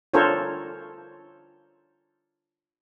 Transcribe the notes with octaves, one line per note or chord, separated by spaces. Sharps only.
D4 F4 A4 A#4 C5 C#5